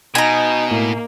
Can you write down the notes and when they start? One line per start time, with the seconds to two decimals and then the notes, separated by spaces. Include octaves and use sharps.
0.15 B2 D#4 G#5 A#5
0.71 A2 A#3